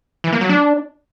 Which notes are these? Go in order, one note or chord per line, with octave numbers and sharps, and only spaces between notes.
E3
A#3
F#3
D4